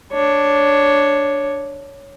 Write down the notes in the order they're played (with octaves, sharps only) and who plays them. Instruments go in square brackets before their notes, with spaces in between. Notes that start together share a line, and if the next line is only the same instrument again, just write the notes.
[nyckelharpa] D4 C#5